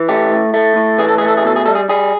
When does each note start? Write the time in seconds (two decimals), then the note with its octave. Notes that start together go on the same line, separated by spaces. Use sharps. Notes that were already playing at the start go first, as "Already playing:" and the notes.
Already playing: E3
0.08 A3 G4
0.31 A2
0.54 A3
0.76 A2
0.98 E3 G#4
1.09 A4
1.18 A3 G#4
1.28 A4
1.37 G#4
1.44 B2 A4
1.56 G#4
1.66 G3 A4
1.75 G#4
1.89 G3 G#4